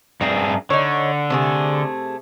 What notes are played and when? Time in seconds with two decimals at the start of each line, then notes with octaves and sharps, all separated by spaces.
0.21 G2 C4 G#4 E5 A5 A#5
0.70 D3 D#4 C#5
1.30 C3 A3 G#4